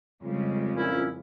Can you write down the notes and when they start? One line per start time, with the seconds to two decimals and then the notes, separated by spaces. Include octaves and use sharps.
0.22 F2 C#3 G3 G#3
0.75 A#2 C#4 E4